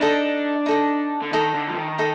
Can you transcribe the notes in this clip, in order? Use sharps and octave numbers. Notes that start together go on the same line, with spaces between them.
D4 D#4 A4 D#5
D#4 A4 D#5
D3
D#3 D#4 A4 D#5
D3
F3
D#3
D#4 A4 D#5